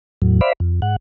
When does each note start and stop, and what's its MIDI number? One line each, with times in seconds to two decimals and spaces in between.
0.22 0.41 40
0.22 0.41 45
0.22 0.41 54
0.41 0.53 72
0.41 0.53 74
0.41 0.53 76
0.41 0.53 77
0.41 0.53 83
0.60 0.80 41
0.82 0.96 44
0.82 0.96 78